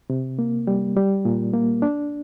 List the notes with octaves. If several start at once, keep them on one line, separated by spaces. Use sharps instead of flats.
C3
A#3
G3
G3
A#2
A#3
D4